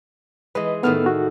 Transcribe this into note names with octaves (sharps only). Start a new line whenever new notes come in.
E3 G#3 B4 D#5
A2 D#3 A3 B3 F6
F#4